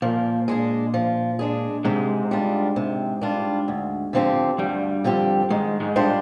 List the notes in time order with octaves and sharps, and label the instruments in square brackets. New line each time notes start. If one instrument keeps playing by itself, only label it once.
[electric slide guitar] A#2 A#3 [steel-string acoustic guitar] F3
[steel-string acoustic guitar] G#3 D4 G#4
F3
G#3 D4 G#4
[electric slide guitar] G#2 G#3 [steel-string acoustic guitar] C3
[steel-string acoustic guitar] G3 D4 F4
C3
G3 D4 F4
D2
D3 F3 C4 G4
[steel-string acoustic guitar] D2 [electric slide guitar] G2 G3
[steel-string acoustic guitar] D3 F3 C4 G4
[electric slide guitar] G#2 G#3 [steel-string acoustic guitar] D#3
[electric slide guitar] G#2 G#3
[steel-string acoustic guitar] G3 D4 F4 C5